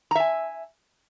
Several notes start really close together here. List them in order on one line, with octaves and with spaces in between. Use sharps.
A#5 E5 G#5